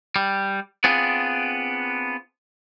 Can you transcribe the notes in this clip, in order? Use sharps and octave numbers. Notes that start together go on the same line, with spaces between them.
G3
B3 C4 D4 F4 G#4